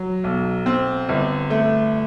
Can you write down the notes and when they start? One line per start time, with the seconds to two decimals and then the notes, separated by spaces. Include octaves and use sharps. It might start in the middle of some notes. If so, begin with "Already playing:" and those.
Already playing: F#3
0.24 B1
0.66 C4
1.09 G1
1.50 A3